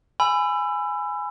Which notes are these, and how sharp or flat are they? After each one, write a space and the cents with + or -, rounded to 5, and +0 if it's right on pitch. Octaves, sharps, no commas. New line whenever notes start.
G#5 +0 B5 +20 E6 +25